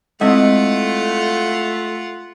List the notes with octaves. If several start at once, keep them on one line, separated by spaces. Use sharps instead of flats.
G#3 A3 C4 E4 F4 D#5 F#5